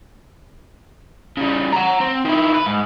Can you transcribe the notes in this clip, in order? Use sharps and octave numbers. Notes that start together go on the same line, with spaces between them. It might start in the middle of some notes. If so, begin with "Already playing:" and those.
C#3 G3
F#5 A#5
C4
D#3 E4
B4
G#2